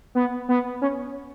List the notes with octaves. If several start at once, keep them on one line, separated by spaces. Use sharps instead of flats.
B3
B3
C#4